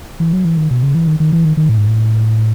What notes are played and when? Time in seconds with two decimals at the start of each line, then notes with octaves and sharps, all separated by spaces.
0.20 E3
0.33 F#3
0.45 E3
0.57 D#3
0.71 B2
0.83 C#3
0.95 E3
1.07 D#3
1.20 D#3
1.33 E3
1.45 D#3
1.57 D#3
1.69 A2
1.78 G#2
1.87 A2